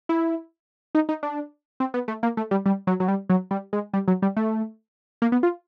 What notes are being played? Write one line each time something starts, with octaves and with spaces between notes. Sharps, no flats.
E4
D#4
D#4
D4
C4
B3
A3
A#3
A3
G3
G3
F#3
F#3
G3
F#3
G3
G#3
G3
F#3
G3
A3
A#3
B3
F4